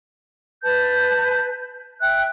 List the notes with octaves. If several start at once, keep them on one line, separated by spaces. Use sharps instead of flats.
B4 A5 G6
E5 G5 F#6